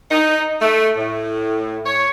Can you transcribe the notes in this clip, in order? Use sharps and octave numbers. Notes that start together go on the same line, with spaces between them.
D#4
A3
A2
C#5